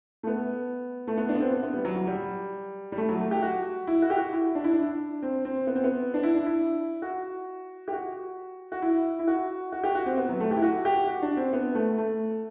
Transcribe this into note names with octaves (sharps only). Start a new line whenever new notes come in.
A3
B3
A3
B3
D4
B3
C4
B3
B3
G3
F#3
F#3
G3
G3
A3
F#3
A3
G4
F#4
E4
F#4
G4
F#4
E4
D4
E4
D4
C4
C4
B3
C4
B3
D4
E4
D4
E4
F#4
G4
F#4
F#4
E4
E4
F#4
F#4
G4
F#4
C4
B3
F#3
A3
G4
E4
F#4
G4
F#4
D4
C4
B3
A3
A3